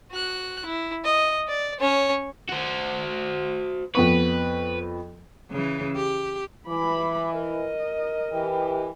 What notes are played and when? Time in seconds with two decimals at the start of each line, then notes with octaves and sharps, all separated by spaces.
0.12 F#4 F#6
0.65 E4
1.04 D#5
1.48 D5
1.80 C#4 C#5
2.49 F#4 C5
3.95 F2 B3 B4 C#6
5.51 C#3 E3
5.96 G4
6.68 E3 B5 D6
7.34 A#4 D#5
8.32 E3 G4